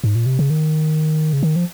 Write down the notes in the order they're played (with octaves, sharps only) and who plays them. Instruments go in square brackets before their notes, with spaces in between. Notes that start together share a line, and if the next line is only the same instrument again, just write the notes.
[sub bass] G#2
A#2
C3
C#3
D#3
C#3
D#3
F3